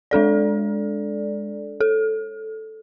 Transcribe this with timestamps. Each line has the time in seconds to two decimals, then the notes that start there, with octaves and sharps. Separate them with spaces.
0.11 G#3 D4 A4 D5
1.80 A4